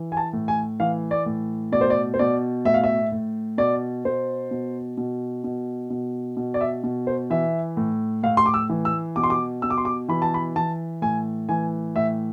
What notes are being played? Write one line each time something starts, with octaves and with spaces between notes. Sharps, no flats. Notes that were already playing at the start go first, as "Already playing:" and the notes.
Already playing: E3
G#5
A5
A2
G#5
E3 F5
D5
A2
B2 D5
C5
D5
C5
B2 D5
A2 E5
F5
E5
A2
B2 D5
B2 C5
B2
B2
B2
B2
B2
D5
E5
B2
C5
E3 E5
A2
A2 F5
C6
D6
E6
E3
E6
B2 D6
C6
D6
B2 E6
D6
C6
D6
E3 B5
A5
B5
E3 A5
A2 G#5
E3 G#5
A2 E5